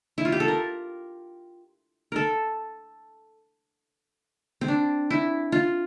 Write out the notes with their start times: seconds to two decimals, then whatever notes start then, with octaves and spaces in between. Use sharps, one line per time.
0.18 E4
0.25 F4
0.32 G4
0.40 A4
0.48 A#4
2.12 A4 A#4
4.61 C4
4.68 D4
5.10 E4
5.52 F4